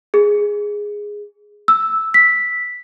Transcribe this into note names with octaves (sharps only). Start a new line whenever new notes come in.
G#4
E6
B6